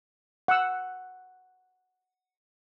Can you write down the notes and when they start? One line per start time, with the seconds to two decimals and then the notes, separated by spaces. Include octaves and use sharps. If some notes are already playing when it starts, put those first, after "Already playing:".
0.48 F#5 E6